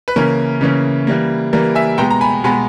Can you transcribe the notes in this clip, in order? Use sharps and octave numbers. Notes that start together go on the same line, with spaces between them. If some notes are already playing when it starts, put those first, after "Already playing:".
B4
C#3 E3 A#3 C#4 A#4
C#3 E3 A#3 C#4
E3 G3 A#3
E3 G3 A#3 A#4
E5 G#5
B2 G#3 B3 G5 A#5
A#5
G#5 B5
B2 G#3 B3 G#5 B5